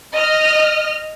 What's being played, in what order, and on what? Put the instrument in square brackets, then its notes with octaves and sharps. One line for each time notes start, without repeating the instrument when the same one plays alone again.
[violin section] D#5 F6